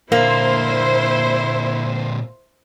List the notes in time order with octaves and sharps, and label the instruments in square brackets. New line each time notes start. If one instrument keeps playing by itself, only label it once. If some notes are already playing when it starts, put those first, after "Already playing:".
[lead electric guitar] A#2 D3 [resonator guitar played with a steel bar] A#3 [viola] E4 [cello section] C5